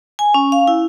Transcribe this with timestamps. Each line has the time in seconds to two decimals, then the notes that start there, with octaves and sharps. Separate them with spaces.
0.19 G#5
0.34 C#4
0.52 F5
0.67 E4